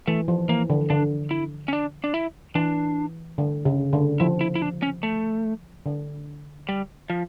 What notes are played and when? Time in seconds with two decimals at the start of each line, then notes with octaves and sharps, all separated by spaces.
0.08 E3 A3
0.28 F3
0.49 E3 A#3
0.70 D3
0.90 D3 D4
1.31 E4
1.68 C#4
1.73 D4
2.04 D4
2.14 E4
2.55 E3 D4
3.38 D3
3.65 C#3
3.93 D3
4.20 F3 E4
4.41 E4
4.55 E4
4.62 D4
4.82 C#4
5.03 A3
5.86 D3
6.69 G3
7.10 F3